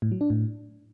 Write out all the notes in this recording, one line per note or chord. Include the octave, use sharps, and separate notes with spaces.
A2
F#3
D4
A2